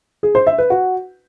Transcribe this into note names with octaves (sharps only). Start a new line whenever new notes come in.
G#4
C5
E5
B4
F#4